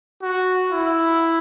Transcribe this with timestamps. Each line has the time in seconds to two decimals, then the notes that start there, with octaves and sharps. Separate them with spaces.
0.22 F#4
0.72 E4